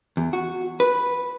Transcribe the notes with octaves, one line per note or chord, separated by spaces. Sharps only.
E2
F#4
B4